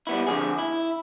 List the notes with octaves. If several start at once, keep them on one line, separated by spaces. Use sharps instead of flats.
G3 B3 E4
F2 D3 F3 G#4
E4